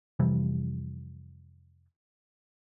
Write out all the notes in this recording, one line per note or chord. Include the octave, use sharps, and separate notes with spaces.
F2 C3 E3 G3